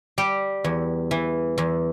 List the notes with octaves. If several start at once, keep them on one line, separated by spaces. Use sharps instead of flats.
G3 G4
E2
E3
E2